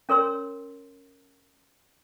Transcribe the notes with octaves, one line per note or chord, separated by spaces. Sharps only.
C#4 A#4 C#5 C6 E6